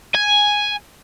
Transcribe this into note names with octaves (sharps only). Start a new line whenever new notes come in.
G#5